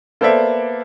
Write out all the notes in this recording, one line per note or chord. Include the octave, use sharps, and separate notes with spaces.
A#3 B3 A4 C5 D5 E5